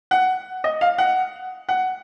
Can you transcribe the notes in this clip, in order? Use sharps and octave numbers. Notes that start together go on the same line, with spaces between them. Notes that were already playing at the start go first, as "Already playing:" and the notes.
F#5
D#5
F5
F#5
F#5